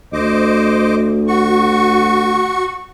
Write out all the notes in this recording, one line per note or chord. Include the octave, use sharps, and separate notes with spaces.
D2 C5 D#5 D6
F#4 C#6